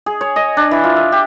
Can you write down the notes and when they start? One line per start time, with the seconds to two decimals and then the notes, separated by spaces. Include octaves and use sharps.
0.06 G#4
0.21 C#5
0.36 D#5
0.57 D4
0.71 E3
0.84 F4
0.96 E5
1.12 G4